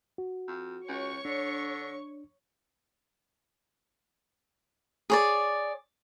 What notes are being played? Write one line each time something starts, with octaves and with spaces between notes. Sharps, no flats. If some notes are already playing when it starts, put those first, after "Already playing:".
F#4
F2
C#2 C#5 C#6
D3 D4
G#4 C#5 D5